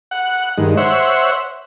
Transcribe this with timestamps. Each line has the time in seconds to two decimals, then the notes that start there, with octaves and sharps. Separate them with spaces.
0.11 F#5
0.58 G2 D#3 G#3
0.77 C5 C#5 E5 F#5